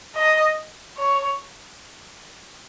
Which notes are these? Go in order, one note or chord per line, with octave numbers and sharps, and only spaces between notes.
D#5
C#5